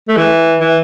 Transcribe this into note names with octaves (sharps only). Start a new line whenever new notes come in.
A3
E3
E3